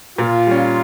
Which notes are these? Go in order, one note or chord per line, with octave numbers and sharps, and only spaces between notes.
A#2 F4
G3 C#4